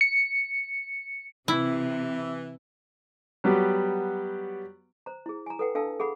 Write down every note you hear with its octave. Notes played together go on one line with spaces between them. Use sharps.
C#7
C3 E3 E4
F#3 G3 B3 G4
C5 A#5
E4 G#4
G#5 A#5
A4 B4 F#5 G5
D4 A4 F5 G5 A5 E6
G#4 A4 F#5 B5